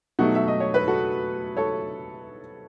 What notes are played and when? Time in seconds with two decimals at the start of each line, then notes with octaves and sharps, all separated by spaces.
0.19 B2 F#3 A3 D#4 F#4
0.35 E5
0.48 D#5
0.60 C#5
0.74 B4
0.87 F#4 A4
1.57 A4 C#5